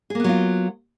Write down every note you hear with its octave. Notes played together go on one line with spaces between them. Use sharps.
F#3 A#3 B3 F4 G#4